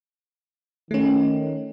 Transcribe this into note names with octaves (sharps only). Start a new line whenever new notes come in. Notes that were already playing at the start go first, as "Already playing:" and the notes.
D#3 A3 C#4